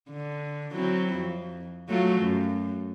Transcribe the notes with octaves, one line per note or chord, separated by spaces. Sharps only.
D3
F#3 C4 E4
F2
F#3 A3 F4
F#2